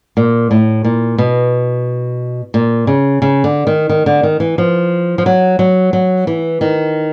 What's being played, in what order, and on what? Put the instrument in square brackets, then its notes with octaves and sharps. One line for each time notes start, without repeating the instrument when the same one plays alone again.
[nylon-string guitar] A#2
A2
A#2
B2
A#2
C#3
C#3
D3
D#3
D#3
D3
D#3
E3
F3
F3
F#3
F#3
F#3
E3
D#3